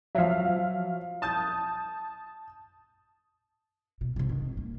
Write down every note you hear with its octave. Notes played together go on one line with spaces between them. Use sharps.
F3 F#3 E5 F5
A5 D#6 G6
B2
A#1 C3
D#3
A#3